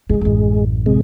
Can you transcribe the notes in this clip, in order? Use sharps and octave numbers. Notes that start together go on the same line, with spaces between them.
G2 D#3 G#3
A1 F#2
C3 G#3